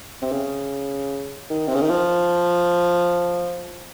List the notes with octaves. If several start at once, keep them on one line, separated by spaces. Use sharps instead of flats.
C3
C#3
D#3
C3
C#3
D#3
F3